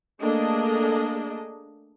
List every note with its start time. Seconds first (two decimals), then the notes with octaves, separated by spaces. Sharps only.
0.20 A3 A#3 D4 G#4 A4 D#5